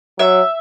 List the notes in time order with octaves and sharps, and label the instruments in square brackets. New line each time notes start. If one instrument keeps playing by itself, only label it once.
[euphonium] F#3 [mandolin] E5